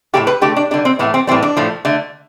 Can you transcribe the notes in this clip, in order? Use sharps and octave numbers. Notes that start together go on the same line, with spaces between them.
A2 F3 A3 G4
B4
D3 A3 G4
D4
D3 G3 D4
C4
A2 E3 A3 B3
C4
A2 E3 G3 C4
D4
A2 F3 A3
D3 A3